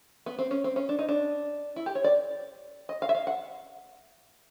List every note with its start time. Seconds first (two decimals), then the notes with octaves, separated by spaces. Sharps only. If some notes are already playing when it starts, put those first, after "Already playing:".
0.26 B3
0.39 C4
0.51 C#4
0.64 C4
0.76 C#4
0.89 D4
0.99 D#4
1.09 D4
1.76 E4
1.86 G4
1.95 C#5
2.04 D5
2.89 D#5
3.02 F5
3.09 E5
3.15 F5
3.27 F#5